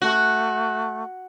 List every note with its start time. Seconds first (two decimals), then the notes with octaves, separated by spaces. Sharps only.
0.02 A3 F#4